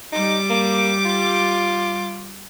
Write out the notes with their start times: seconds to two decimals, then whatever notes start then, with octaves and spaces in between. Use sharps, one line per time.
0.12 G3 D#4 D6
0.50 A#3
1.05 F4